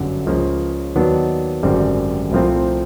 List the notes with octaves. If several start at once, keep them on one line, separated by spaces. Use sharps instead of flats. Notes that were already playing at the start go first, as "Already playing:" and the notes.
Already playing: G1 F#2 D3 F#3
C#2 C#3 F3 A#3
D#2 D#3 F#3 B3 D4
G#1 F#2 D3 G3 C4
C2 A#2 F3 A3 C4